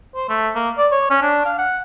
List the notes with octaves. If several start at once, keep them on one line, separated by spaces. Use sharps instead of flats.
C5
A3
A#3
D5
C#5
C#4
D4
F5
F#5